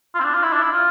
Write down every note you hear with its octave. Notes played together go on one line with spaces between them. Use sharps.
F4
C4
D4
F4
E4
D4
E4
F4